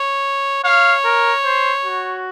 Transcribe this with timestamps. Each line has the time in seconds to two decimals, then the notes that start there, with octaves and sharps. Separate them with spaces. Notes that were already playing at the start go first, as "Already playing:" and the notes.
Already playing: C#5
0.64 C#5 F5
1.04 A#4
1.44 C5
1.84 F#4